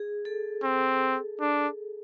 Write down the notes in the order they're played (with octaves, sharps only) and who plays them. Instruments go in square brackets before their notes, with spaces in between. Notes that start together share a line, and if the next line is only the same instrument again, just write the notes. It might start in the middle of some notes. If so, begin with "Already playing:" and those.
Already playing: [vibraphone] G#4
A4
[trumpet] C4
D4